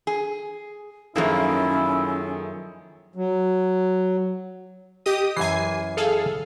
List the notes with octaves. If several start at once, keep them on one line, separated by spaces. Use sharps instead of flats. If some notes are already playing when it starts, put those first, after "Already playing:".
G#4
F#2 D#3 F3 A#3 C#4 E4 G#4 A4
F#3
G4 D#5 D#6
F#2 E3 G#5 C7
G#4 A4 F5